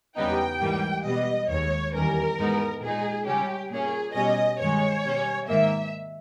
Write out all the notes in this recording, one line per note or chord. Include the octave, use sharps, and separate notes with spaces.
E2 C#3 G3 B3 D#4 G5
G#2 E3 G3 A#3
B2 G3 B3 D#5
D#2 D#3 G#3 C#5
E2 D#3 G3 C#4 A#4
G#2 E3 G#3 B3 D#4
A#2 G#3 D#4 G#4
C#3 G3 C#4 G4
A#2 A#3 C#4 G#4
B2 G3 C#4 D#5
G2 D#3 G#3 C#4 C#5
B2 G3 C#4
G#2 D#3 A#3 E5